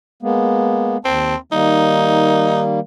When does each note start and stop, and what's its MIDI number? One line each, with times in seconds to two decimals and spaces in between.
0.23 0.97 56
0.23 0.97 58
0.23 0.97 59
1.05 1.35 39
1.05 1.35 60
1.05 1.35 81
1.52 2.80 51
1.52 2.80 55
1.52 2.80 58
1.52 2.62 63